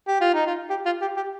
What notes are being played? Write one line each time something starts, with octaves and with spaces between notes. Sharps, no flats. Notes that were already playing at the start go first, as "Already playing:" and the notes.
G4
F4
D#4
F4
G4
F4
G4
G4